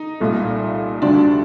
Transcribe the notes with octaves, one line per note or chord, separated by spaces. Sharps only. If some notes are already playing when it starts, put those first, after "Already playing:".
Already playing: D#4
C2 A#2 A3
D2 C3 G3 D4